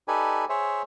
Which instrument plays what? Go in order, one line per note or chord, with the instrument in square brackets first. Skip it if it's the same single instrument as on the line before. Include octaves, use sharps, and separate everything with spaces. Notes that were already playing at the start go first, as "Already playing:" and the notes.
[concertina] D#4 G4 A4 B4 D5 G#5
G#4 C5 C#5 E5